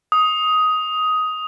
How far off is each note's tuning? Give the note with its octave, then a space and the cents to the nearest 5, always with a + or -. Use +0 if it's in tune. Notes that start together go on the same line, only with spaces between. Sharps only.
D#6 +10